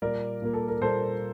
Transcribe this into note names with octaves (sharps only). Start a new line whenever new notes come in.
A#2 G3 A#3 A#4 D5
A#2 G3 A#3
A4
A#4
A#2 G3 A#3 A4 C5